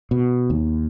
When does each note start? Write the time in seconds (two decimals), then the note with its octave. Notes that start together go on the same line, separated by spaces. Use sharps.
0.11 B2
0.50 D#2